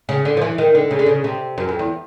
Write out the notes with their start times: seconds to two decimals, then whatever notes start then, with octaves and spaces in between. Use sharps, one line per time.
0.09 C#3
0.25 D3
0.37 F3
0.41 E3
0.58 D#3
0.75 D3
0.91 C#3
0.99 D3
1.06 C#3
1.24 C3
1.58 F#2
1.69 F2
1.79 E2